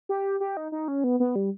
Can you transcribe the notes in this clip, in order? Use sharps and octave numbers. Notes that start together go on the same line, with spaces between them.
G4
G4
D#4
D#4
C#4
B3
B3
G3